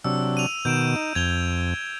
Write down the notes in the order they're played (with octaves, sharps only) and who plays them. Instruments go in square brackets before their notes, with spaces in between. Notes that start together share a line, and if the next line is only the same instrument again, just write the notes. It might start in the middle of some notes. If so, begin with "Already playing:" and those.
[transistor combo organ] C3 F#3 D4 [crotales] E6
[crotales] D#7 F7
[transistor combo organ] B2 D#3 [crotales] G6 D7 E7
[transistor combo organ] D#4
[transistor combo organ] F2 [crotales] G#6 F7 G7